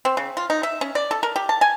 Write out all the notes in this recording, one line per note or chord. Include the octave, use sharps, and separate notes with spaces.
C4
C#3
F4
D#4
E5
C#4
D5
A4
A#4
G4
A5
G#5